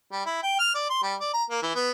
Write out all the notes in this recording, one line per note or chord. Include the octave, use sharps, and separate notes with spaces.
G3
E4
G5
F6
D5
C6
G3
D5
A#5
A#3
E3
B3